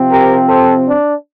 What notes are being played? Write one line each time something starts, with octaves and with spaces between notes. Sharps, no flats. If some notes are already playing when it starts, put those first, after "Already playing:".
Already playing: C3 F3 C4
G4 A#4
A4 C5
D4